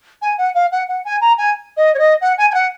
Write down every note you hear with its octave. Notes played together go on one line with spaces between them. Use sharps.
G#5
F#5
F5
F#5
F#5
G#5
A#5
G#5
D#5
C#5
D#5
F#5
G#5
G#5
F#5